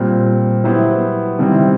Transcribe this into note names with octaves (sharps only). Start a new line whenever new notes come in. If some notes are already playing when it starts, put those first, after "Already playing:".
Already playing: A#2 G3 C4
F#3 B3 E4 G4 C5
C3 D#3 G3 C4 E4